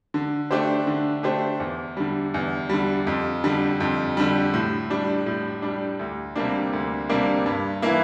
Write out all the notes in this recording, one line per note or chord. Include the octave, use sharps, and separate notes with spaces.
D3
A3 D4 G4 C5
D3
A3 D4 G4 C5
E2
D3 G3
E2
D3 G3
F2
D3 G3
F2
D3 G3
A2
G3 D4
A2
G3 D4
D2
C3 G3 A#3 D4
D2
C3 G3 A#3 D4
G2
E3 A#3 E4